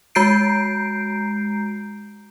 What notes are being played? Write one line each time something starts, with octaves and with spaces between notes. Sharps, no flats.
G#3 F#4 A#5 G6 C7 D7